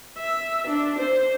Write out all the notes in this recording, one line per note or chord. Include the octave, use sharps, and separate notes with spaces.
E5
D4
C5